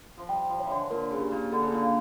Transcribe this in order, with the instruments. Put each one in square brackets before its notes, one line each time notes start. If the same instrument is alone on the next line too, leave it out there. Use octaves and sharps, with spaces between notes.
[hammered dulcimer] F3
[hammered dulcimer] G3 [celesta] G5
[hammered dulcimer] F3
[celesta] C#5
[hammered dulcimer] E3
D3
[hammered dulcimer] A#2 [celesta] A#4
[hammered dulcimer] C#3
[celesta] G4
[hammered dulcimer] A#2
[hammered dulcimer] D3 [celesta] A4
[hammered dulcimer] C#3
A#2
[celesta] F5